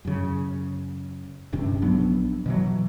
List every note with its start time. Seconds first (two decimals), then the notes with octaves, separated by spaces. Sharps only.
0.05 F#2 C#3
1.52 D1 G2 C3 C#4
1.82 A#1 F#3 B3 D4
2.46 B2 E3 F#3